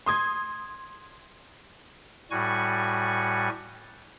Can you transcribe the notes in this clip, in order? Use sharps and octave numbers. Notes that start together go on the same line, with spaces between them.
C6 D#6 G#6
A2 G3 F#4 G#5 C#6